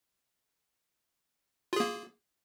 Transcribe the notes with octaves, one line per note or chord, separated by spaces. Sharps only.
A#3 F4 G#4